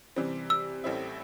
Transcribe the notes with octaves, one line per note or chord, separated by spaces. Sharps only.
C3 E3 G3 C4
E6
A1 A2 G3 C4 E4